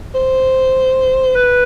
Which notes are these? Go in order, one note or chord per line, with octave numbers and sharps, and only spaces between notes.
C5
B4